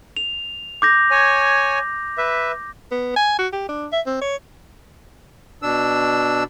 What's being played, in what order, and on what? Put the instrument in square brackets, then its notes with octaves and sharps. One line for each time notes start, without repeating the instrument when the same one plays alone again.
[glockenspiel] F7
D6 G6 A#6
[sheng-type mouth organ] C#5 G#5
B4 E5
[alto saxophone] B3
G#5
F#4
G4
D4
E5
C4
C#5
[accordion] B2 D4 E6